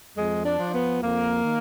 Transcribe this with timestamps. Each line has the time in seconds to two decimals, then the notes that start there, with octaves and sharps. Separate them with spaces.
0.16 F2 G#3
0.45 D4
0.59 F3
0.73 B3
1.02 F2 A#3
1.44 D#3